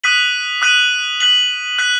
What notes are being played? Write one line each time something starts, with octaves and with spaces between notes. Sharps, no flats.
D#6 F#6 B6 D#7 F#7
D#6 F#6 B6 D#7 F#7
F#6 B6 F#7
F#6 B6 F#7